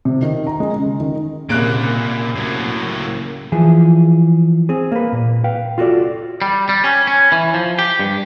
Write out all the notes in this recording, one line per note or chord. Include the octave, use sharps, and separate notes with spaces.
C3
D#3
A#5
G#3
C#3
D#3
C2 A#2 C#3 A#3 F#6 D7
A2 F#3
E3 F3 G#4
C4 G#4
A#3 B4
A#2
B4 F5 G5
F4 F#4 A4 D5
G3
G3
C#4
C#4
E3
F3
G4
G2